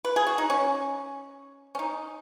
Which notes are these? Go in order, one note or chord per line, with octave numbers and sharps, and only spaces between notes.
B4
G#4
F#4
D#4
C#4
C#4
D#4